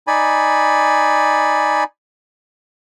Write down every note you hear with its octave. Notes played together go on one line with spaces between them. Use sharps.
D#4 D5 G#5 B5